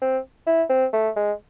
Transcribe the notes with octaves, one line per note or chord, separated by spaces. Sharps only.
C4
E4
C4
A3
G#3